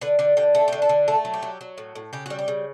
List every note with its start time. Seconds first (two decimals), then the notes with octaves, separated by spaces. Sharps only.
0.01 D3 B4
0.19 D3 G4
0.37 D3 G4
0.55 A3 A4
0.68 D3 G4
0.82 A4
0.89 D3
1.08 A3 A4
1.25 F#3
1.34 G4
1.43 F#3
1.61 F#3
1.78 A2
1.95 A2
2.13 C#3 G4
2.26 G3 F#4
2.39 G4
2.48 C#3